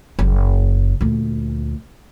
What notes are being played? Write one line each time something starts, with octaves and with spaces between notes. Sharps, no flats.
F#1
D2 A#2